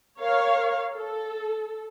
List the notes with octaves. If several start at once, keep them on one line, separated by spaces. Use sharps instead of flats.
A#4 C#5 F5
A4